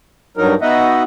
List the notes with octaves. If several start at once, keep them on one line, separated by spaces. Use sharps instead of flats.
G2 F#3 D#4 A#4
B3 D#4 F#4 D#5 E5 F#5